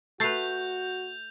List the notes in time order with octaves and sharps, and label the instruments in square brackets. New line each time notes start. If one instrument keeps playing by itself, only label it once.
[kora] A3 B4 [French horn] F#4 [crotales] G6 F7 [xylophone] A6 C7